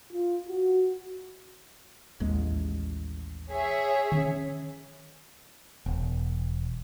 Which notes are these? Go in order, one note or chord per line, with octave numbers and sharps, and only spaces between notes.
F4
F#4
A1 D#2 G#3
G#4 C#5 E5
D#3 C#4
E1